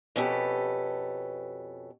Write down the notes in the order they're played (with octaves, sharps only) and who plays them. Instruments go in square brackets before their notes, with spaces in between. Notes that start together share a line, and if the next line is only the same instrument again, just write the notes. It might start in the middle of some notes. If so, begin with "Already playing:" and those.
[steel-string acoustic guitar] F2 B2 C#4 G4 A4 B4